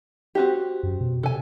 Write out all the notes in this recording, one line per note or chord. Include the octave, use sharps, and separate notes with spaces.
C4 F#4 G4
F#2
B2
C3 A4 G#5